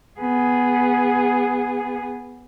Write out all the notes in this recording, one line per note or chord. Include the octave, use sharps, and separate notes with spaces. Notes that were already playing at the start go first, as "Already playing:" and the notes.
B3 G#4